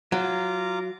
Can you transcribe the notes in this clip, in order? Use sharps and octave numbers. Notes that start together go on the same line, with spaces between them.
F#3 F4 A#5 D6